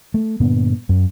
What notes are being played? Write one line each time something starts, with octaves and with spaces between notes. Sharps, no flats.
A3
G2 A#2 D3 B3
F#2